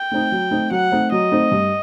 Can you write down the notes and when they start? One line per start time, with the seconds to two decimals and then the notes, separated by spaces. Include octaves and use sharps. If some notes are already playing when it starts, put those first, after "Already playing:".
Already playing: G5
0.12 A3 C4 D#4
0.32 F#3
0.51 A3 C4 D#4
0.71 F#3 F#5
0.92 A3 C4 D#4
1.12 F#3 D#5
1.32 A3 C4 D#4
1.51 G2